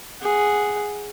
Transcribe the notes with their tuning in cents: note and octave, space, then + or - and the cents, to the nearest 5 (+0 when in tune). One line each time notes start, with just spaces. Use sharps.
G#4 +0 F#5 +0